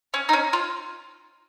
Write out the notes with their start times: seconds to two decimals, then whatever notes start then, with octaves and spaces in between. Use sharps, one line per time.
0.14 C#4
0.29 D#4
0.33 C#4
0.53 F4